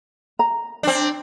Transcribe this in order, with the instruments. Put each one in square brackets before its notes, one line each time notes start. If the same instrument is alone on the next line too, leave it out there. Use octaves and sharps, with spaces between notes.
[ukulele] A#5
[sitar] C4 D4